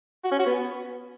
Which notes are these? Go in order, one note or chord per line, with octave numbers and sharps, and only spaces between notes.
F#4
C#4
F#4
B3